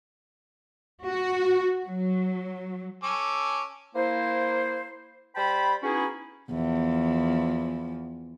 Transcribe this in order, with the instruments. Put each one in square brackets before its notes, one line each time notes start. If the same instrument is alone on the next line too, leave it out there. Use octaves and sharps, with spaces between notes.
[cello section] F#4
F#3
[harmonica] C#4 A4 D6
[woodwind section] A#3 E4 C5
G3 C5 G5 A5 B5
B3 C#4 D#4 E4 F#4 G#4
[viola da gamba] E2 F3